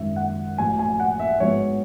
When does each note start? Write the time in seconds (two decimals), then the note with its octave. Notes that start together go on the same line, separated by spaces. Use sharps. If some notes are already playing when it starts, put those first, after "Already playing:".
Already playing: G#1 F#2 D#3 E5
0.16 F#5
0.58 A1 A2 F#3 G#5
0.79 G#5
1.00 F#5
1.19 E5
1.40 G#2 F#3 B3 C#5